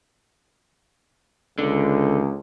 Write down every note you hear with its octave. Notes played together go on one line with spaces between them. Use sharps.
C#2 D3